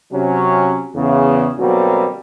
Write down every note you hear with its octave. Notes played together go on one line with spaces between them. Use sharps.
C3 F#3 C#4
E2 C#3
B2 D3 F#3 G3 A#3 C4